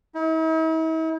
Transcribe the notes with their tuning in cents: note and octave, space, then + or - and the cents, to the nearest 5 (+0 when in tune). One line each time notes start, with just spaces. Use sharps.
E4 -45